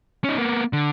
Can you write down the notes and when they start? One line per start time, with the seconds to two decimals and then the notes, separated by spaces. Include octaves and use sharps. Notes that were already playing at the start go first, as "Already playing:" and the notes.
0.24 C#4 D#4
0.38 A#3 B3
0.73 D3